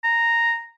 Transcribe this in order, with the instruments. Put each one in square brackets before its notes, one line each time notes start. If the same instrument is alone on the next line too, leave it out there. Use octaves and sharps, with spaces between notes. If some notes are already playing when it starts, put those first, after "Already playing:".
[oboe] A#5